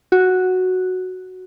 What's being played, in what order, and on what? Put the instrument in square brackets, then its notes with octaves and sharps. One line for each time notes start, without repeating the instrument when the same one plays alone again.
[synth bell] F#4